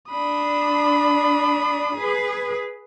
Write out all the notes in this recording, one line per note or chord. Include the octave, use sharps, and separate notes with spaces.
D4 B5 D#6
G#4 B4